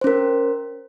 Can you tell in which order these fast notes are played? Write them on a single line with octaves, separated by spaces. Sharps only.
C5 C#4 A#4